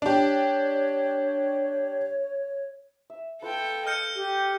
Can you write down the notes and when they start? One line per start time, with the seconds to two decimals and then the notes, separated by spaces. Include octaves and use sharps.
0.02 D4 G4 C#5
3.10 E5
3.42 F4 A4 B4 G5
3.87 D#5 F6 G6 C#7
4.15 G4